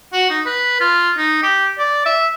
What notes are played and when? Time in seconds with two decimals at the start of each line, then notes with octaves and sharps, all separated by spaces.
0.13 F#4
0.30 D#4
0.46 B4
0.80 F4
1.18 D#4
1.43 G4
1.79 D5
2.06 E5